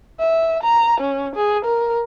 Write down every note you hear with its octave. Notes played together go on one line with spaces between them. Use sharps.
E5
A#5
C#4
G#4
A#4